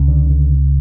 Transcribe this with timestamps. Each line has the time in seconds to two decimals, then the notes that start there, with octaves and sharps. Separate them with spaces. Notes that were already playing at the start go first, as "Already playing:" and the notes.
Already playing: C#2 C#3
0.08 D3
0.30 D3